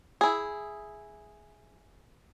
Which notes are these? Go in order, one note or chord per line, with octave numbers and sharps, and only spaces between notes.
E4 G#4